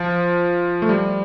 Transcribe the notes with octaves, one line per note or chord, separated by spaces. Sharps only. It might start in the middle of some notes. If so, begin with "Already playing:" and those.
Already playing: F3
A3
G3